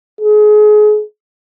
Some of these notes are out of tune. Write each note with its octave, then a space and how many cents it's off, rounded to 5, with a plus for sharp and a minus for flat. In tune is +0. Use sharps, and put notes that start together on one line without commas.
G#4 +30